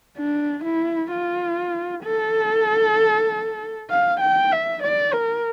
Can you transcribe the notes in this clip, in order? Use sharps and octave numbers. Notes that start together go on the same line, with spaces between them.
D4
E4
F4
A4
F5
G5
E5
D5
A#4